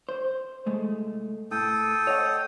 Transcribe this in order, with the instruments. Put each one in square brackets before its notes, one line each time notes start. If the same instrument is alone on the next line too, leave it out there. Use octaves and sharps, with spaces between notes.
[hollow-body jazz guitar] C5
C2 G#3 A3
[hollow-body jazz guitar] A2 [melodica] A4 G5 D#6
[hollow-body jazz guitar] C#5 D#5 F#5